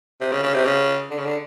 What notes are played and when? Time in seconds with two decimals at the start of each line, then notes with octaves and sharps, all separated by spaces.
0.20 C3
0.32 C#3
0.43 C#3
0.54 C3
0.65 C#3
1.10 D3
1.18 C#3
1.25 D3